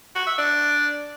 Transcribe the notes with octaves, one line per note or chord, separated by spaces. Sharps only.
F#4
E5
D4